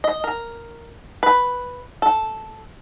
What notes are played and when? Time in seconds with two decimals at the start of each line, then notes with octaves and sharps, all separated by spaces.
0.04 D#5
0.24 A#4
1.23 B4
2.02 A4